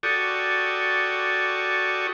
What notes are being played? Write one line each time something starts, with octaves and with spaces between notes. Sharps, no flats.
F#4 G4 A4 D5 C#6 D#6